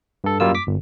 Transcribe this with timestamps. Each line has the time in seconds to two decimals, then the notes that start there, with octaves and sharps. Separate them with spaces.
0.24 G2 A4
0.40 F#2 G3 A#3 F4 E6
0.55 D6 B6
0.67 G1